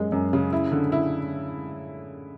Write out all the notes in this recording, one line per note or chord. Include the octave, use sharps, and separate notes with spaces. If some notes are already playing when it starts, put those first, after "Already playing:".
Already playing: F#2 G#3
F#2
C#3
E4
D3
E4